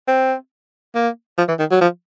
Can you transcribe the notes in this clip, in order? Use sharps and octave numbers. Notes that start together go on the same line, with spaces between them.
C4
A#3
F3
E3
D#3
F#3
F3